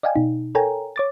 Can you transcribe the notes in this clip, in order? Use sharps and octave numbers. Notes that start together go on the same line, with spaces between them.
D5 D#5 F5 G5 G#5
B2 D#4
A4 A#4 C#5 G5 G#5 A#5
C#5 D6 A6